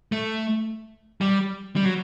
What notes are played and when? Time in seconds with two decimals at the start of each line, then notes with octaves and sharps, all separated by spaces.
0.12 A3
1.21 G3
1.76 G3
1.85 F#3